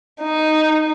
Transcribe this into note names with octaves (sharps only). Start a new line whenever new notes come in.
D#4